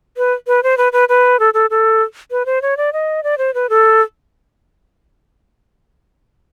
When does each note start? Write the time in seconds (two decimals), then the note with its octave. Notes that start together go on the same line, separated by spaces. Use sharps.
0.17 B4
0.47 B4
0.63 C5
0.77 B4
0.93 B4
1.09 B4
1.40 A4
1.54 A4
1.70 A4
2.31 B4
2.46 C5
2.62 C#5
2.77 D5
2.93 D#5
3.24 D5
3.38 C5
3.54 B4
3.70 A4